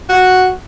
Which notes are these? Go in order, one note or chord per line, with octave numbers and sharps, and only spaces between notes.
F#4